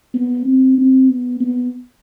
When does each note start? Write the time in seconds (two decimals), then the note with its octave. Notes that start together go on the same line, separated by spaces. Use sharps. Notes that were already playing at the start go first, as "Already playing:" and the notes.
0.14 B3
0.45 C4
0.78 C4
1.09 B3
1.41 B3